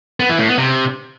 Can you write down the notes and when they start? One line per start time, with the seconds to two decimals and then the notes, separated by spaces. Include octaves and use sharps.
0.20 B3
0.29 E3
0.39 A2
0.49 B3
0.58 C3